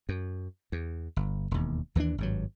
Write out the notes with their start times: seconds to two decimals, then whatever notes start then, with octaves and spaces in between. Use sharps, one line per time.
0.09 F#2
0.72 E2
1.16 G1
1.51 E1 D#2
1.95 D#2 E3 A#3 D4
2.18 G#1 G2 F#3